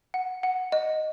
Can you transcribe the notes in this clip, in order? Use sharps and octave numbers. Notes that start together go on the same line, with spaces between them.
F#5
F#5
D#5